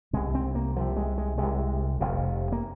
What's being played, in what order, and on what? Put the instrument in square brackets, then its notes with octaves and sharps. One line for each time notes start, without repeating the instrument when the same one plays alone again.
[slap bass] C2 C3 G#3
C4
A#3
C2 C3 F3
G#3
G#3
C2 C3 G#3
F1 F2 C3
A#3